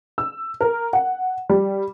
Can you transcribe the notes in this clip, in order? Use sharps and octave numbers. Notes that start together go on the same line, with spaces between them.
E6
A#4
F#5
G3